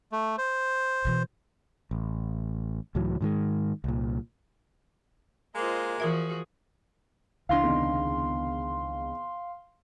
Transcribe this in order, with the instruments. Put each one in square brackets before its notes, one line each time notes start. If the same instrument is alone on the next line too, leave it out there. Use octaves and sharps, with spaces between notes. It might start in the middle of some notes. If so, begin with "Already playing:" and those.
[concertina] A3
C5
[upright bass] B2 E3
[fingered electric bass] A1
C#2 A2 E3 F#3
G#2 D#3 F#3 G#3
C2 A#2
[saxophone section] G#3 A#3 [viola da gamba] F4 C5 D#5
[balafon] E3 A#4 E5 [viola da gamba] F3 F#4 G#4
[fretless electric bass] C#2 D4 [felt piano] E3 A#6 [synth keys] F5 C6
[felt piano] E2 C3 D#3